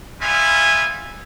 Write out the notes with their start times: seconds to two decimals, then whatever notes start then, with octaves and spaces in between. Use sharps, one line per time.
0.21 G3 B3 F4 E5 G#5